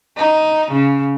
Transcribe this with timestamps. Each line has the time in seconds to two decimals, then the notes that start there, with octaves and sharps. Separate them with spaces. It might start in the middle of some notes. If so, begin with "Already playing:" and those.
0.17 D#4
0.71 C#3